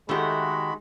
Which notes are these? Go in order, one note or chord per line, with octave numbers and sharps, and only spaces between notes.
D#3 G#3 A3 F#4 G4 F#5 B5